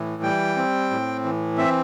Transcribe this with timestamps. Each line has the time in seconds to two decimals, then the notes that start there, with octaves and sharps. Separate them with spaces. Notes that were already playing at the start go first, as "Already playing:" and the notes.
Already playing: A2 E3
0.23 G3 G5
0.57 C4
0.90 A2
1.24 E3
1.58 C4 E5